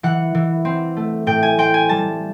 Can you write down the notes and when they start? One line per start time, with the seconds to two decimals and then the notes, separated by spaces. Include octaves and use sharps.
0.03 E3 F#5
0.35 E3
0.65 C4
0.97 A3
1.27 A2 G5
1.43 G#5
1.58 C4 G5
1.74 G#5
1.89 G3 A5